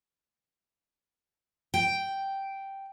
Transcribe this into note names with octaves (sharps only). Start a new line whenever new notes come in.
G5